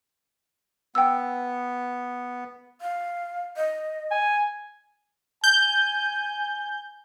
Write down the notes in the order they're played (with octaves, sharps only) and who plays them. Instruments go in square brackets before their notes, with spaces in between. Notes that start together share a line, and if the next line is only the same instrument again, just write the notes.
[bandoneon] B3 [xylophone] G5 E6
[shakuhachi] F5
D#5
[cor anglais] G#5
[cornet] G#5 [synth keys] G6